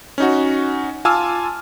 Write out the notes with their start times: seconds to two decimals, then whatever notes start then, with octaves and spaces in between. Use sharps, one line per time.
0.18 C#4 D#4 F#4
1.05 F4 G#5 A5 D6 E6 F6